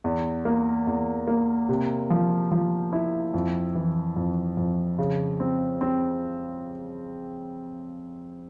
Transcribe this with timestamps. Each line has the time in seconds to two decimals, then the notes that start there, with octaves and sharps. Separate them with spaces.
0.04 E2
0.45 A#3
0.87 E2
1.27 A#3
1.69 C3
2.10 F3
2.51 F3
2.93 E4
3.34 F2
3.75 E3
4.16 F2
4.57 F2
4.99 C#3
5.40 C4
5.81 C4